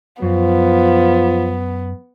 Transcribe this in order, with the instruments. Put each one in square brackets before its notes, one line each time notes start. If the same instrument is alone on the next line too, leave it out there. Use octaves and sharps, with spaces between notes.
[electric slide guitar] F#2 [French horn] F3 [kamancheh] B3